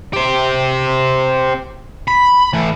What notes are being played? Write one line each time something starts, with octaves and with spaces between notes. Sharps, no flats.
G4 C5
B5
E3 A3